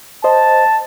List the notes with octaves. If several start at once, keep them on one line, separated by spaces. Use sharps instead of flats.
C5 D#5 A5